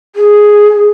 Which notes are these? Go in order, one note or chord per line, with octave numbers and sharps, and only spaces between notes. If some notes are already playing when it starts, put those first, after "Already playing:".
G#4